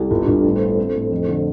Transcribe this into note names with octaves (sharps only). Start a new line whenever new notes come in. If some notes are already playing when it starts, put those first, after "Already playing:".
Already playing: C2 G4 A4
G1 F4
D4
G1
A2 A4
C5
F4 A4
C4
A2
F2
D3